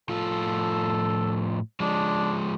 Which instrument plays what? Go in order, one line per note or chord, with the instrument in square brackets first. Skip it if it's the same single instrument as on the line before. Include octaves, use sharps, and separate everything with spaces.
[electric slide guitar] A2 F3 F4 [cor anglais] A4
[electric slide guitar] F3 G#3 [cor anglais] D4